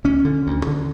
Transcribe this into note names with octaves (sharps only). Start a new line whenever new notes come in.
D2 C#4
D3
D2
D3